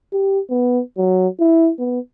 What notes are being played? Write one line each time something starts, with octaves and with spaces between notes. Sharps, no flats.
G4
B3
F#3
E4
B3